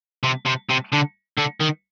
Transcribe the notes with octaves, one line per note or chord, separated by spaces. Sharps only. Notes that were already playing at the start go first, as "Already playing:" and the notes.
C3
C3
C3
D3
D3
D#3